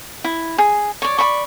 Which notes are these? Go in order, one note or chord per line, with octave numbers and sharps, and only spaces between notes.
E4
G#4
C#5 D5
D5 B5 C#6